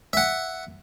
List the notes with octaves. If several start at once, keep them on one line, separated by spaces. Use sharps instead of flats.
E5 F#5